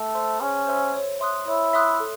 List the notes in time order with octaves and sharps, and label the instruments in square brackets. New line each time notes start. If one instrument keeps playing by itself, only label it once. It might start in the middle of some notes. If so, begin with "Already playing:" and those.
Already playing: [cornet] A3
[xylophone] C5 E5 C6 E6
[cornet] C#4 [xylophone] G#4
[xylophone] C5 E5 C6 E6
C#5
E5 C6 D#6 F#6
[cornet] E4 [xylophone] C#5
[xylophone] E5 C6 D#6 F#6
A4